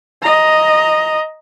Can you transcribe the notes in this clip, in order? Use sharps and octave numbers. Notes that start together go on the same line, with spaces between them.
D#5 A#5